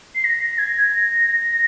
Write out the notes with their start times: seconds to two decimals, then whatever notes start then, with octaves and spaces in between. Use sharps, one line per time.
0.15 C7
0.24 A#6
0.58 G#6
0.93 A#6